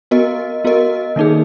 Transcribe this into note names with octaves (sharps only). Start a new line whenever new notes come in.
B3 F#4 A#4 D#5
B3 F#4 A#4 D#5
D#3 A#3 D#4 G#4